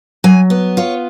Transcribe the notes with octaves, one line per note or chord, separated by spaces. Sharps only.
F#3 G#5
B3
F4 C#5